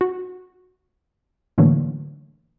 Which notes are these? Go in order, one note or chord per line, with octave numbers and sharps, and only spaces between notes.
F#4
A2 D3 E3 F#3 A3 A#3